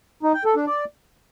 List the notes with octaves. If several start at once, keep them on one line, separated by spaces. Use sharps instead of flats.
D#4
G5
A4
D4
D5